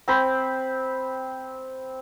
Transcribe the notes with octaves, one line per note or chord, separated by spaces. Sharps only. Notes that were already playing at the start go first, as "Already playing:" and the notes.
C4 C5 B5